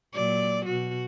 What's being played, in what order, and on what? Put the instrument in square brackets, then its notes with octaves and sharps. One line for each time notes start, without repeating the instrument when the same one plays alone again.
[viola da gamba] A#2 F#3 D5
B2 F#4